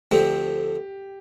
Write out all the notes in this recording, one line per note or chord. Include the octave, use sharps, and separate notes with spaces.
D2 D3 F3 A3 C4 G4